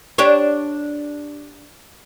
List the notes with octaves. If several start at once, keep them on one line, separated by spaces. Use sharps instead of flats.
D4 G4 C#5